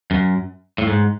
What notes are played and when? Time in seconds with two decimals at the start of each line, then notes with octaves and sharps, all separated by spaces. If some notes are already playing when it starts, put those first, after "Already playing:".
0.11 F#2
0.78 A2
0.87 G#2